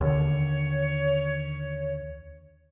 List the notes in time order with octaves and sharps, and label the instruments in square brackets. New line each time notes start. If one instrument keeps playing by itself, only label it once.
[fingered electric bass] D#2 D3 [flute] C#5